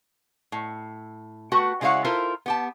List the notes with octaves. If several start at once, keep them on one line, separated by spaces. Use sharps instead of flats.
A2
A3 F#4 B4 G5
C#3 G#3 E4 C#5 F5 F#5
E4 F4 A4 A#4 C5
B3 G4 A5